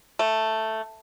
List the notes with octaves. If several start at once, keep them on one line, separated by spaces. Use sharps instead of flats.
A3